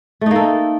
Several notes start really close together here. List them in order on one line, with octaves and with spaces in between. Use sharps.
A3 D#4 A#3 A4